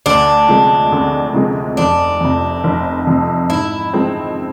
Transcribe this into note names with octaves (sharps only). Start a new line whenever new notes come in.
D2 D4
C3 F3 G#3
D2
C3 F3 G#3
F1 D4
F2 C3
F1
F2 C3
G#2 E4
F3 G#3 C4